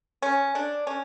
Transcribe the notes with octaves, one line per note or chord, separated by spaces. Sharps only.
C#4
D4
C#4